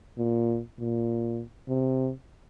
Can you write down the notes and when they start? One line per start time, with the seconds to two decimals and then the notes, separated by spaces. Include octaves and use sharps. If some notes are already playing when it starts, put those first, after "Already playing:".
0.18 A#2
0.79 A#2
1.68 C3